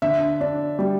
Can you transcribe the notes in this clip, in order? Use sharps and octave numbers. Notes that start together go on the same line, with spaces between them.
D3 E5
D4
G3